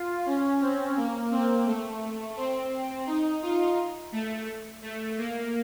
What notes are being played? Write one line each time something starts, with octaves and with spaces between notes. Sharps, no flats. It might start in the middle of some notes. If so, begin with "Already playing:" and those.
Already playing: F4
C#4
C4
A#3
C4
A3
C4
D#4
F4
A3
A3
A#3